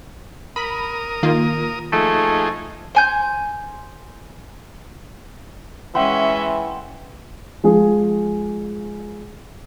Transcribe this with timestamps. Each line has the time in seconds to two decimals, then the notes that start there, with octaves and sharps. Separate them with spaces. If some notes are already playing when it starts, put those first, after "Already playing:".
0.56 A#4 B5 D#6
1.23 D#3 A#3 F4
1.92 F3 A3 D#4 G#4
2.95 C5 G#5 G6
5.95 E3 G#3 C#4 E5 F#5 G5 C6
7.64 F3 G#3 G#4